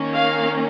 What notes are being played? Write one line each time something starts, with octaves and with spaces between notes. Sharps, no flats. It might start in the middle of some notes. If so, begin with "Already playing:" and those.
Already playing: D#3 A#3 C#4
F5